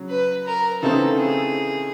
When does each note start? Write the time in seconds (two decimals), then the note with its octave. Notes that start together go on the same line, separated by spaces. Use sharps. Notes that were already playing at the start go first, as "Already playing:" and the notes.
Already playing: C#3 F#3
0.09 B4
0.47 A#4
0.83 C#3 E3 A3 C4 D#4 A4
1.19 G#4